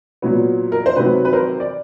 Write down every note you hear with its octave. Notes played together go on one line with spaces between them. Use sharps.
A#2 F#3 B3
A#4
C5
C3 D#3 F#3 B4
B4
A#4 C5
D5